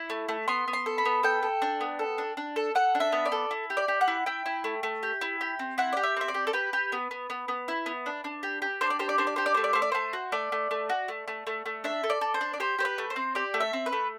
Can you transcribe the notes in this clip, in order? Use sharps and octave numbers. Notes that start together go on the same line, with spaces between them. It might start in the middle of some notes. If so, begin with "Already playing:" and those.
Already playing: E4 E5
A3
A3
B3 C6
B3
C6
A4
B5
B3
A4 G5
A4
D4
B3
A4
D4
D4
A4
A4 F#5
D4
E5
B3
D5
A4
E4
G4
D5
G4
F#5
E4
E4 G5
E4
A3
A3
G4
E4
G4
C4
E4 F#5
G4 D5
E5
C4 E5
D5
G4
A4
G4 B4
G4
B3
B3
B3
B3
E4
B3
D4
D4
G4
G4
D4 C5
D5
G4 C5
D5
D4 C5
D5
G4 C5
D5
A3 C5
D5
A3 C5
D5
A3 C5
F#4
A3 D5
A3
A3
F#4
A3
A3
A3
A3
D4 E5
A4
D5
A4
C5
D4
D5
G4 C5
G4 C5
B4
A3
C5
C4
G4 D5
A3
E5
C4
B4
A3